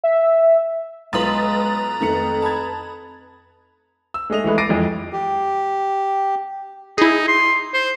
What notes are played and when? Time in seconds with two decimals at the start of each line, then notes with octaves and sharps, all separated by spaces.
0.04 E5
1.13 B1 G#3 F4 B4 A#5 C6 D#6 A6
2.01 F2 D#3 A3 C#7
2.42 A5 B5 G#6
4.14 E6
4.30 G#3 A3 D#5 F7
4.44 E3 G#3 A3 B4
4.58 D6 A6 A#6 C7 D7 D#7
4.69 F2 E3 G#3
5.13 G4
6.98 D#4 E4 G#4
7.28 C6
7.74 C5